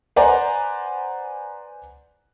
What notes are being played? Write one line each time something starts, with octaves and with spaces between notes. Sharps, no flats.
B4 C5 D5 F#5 G#5 A#5